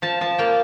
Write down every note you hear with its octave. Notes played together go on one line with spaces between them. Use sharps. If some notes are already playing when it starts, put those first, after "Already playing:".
F3 A5
F3 A5
A#3 G5